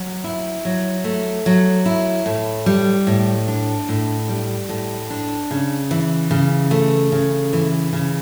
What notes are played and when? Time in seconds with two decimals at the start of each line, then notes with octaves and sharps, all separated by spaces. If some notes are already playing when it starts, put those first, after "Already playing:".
Already playing: F#3
0.24 E4
0.65 F#3
1.04 A3
1.46 F#3
1.86 E4
2.26 A2
2.66 G3
3.07 A2
3.48 D4
3.89 A2
4.29 G3
4.69 A2
5.10 D4
5.51 C#3
5.91 E3
6.31 C#3
6.71 A3
7.12 C#3
7.53 E3
7.93 C#3